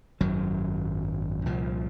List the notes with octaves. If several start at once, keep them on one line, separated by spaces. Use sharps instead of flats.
G#1 F#2 D#3 F#3
C2 A#2 F3